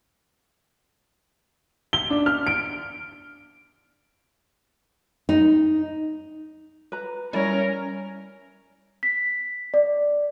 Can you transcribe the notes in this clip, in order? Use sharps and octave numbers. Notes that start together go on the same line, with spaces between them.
G7
D4
F6
D7
D#4
B4 A#5
G3 C#4 E4 A#4 C#5
B6
D5